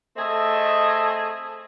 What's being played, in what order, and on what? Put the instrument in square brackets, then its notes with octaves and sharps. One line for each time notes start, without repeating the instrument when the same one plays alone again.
[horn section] A3 C4 G#4 D#5 E5